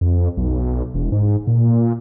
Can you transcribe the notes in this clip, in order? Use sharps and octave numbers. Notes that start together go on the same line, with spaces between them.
F2
B1
E1
G#2
A#2